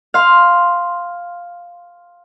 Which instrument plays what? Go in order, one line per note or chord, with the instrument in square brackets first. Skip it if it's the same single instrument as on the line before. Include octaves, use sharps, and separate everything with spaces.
[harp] F5 C6